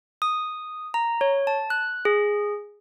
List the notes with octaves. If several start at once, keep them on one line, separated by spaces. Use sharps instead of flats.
D#6
A#5
C#5
A5
F#6
G#4